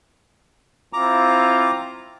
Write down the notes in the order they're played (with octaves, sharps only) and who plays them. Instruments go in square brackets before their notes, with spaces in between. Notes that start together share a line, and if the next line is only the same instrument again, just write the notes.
[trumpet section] C4 E4 F4 [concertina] A#5 D6